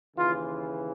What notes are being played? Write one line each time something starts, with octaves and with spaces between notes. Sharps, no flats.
D#2 C#3 E3 F4